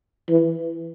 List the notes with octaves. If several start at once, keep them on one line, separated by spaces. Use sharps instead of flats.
E3